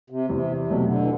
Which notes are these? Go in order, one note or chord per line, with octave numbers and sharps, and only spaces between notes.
C3
E2 C3
C3
B2 F#3 A3
D3
E3